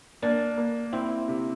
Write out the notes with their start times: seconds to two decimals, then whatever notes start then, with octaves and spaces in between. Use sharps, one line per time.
0.22 A#3 D4
0.58 A#3
0.93 C4 E4
1.28 C3